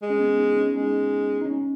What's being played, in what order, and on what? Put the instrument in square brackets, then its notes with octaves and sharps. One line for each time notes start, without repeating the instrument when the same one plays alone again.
[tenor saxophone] G#3
[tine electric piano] C#4
B3
D#4
C#4
[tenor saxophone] G#3 [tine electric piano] D#4
[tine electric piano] D#4
C#4